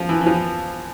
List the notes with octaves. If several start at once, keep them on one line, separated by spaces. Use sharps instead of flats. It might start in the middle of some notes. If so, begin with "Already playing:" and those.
Already playing: F3
E3
E3
F3